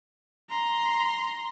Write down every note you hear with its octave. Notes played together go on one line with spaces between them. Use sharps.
A#5 C6